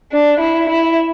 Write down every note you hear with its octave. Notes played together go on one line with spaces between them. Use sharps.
D4
E4
E4